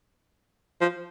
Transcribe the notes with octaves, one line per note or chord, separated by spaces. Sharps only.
F3